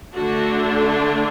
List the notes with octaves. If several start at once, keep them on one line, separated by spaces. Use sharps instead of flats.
D3 A3 D4 F#4